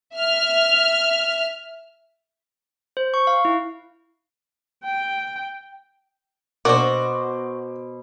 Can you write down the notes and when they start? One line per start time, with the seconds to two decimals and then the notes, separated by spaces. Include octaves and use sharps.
0.14 E5 F6
2.97 C5
3.14 C#6
3.27 F5
3.45 E4
4.84 G5
6.65 B2 A#3 D4 F#4 C5 D6